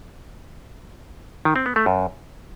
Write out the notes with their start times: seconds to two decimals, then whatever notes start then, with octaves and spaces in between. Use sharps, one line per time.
1.45 D#3
1.56 C4
1.66 B3
1.76 A3
1.86 F#2